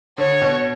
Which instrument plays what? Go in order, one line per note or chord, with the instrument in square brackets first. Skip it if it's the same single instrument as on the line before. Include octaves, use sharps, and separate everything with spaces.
[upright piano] D3 [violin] C#5
[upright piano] B2